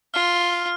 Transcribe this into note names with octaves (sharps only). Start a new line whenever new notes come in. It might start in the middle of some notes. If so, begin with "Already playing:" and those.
F4 F6